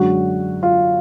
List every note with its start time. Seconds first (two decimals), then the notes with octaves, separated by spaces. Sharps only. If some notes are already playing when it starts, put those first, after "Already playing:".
Already playing: F#2 D3 G#3 F#4
0.63 F4